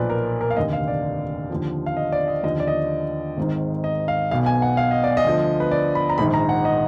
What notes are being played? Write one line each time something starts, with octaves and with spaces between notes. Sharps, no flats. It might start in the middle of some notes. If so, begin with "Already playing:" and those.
Already playing: B1 A#2 F3 B4 D5
A#4
A#4
F5
F1 D#2 D3 D#5
F5
D5
D#2 D3 F3
F5
D#5
D5
D#5
D#2 D3 F3 D#5
D5
D#5
G#1 G#2 D#3
D#5
F5
B1 B2 F5
G#5
F#5
F5
D#5
D5
D#5
D2 D3 F3
B4
D5
B5
A#5
A#1 G#2 D#3 B5
A#5
F#5
D#5